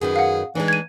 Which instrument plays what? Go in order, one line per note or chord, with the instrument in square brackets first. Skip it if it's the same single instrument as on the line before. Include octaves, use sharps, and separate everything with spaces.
[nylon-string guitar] F#2 D#3 B4 [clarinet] G#4
[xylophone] F5 F#5
[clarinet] E3 [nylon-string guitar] G#3 D4 D#4
[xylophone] G#6 D#7